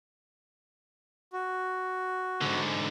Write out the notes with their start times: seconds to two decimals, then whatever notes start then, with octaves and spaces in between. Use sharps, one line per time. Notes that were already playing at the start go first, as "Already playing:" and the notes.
1.33 F#4
2.41 G#2 D3